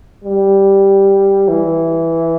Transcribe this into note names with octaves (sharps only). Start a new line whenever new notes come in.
G3
E3